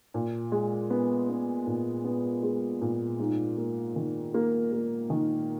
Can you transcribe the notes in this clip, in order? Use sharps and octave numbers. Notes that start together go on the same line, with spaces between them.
A#2
G#3
B3
B3
A#2
B3
G#3
A#2
G#2
A#3
D#3
A#3
A#3
D#3